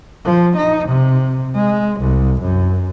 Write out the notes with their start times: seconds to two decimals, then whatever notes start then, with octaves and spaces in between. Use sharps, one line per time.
0.25 F3
0.56 D#4
0.88 C3
1.55 G#3
2.00 C2
2.41 F#2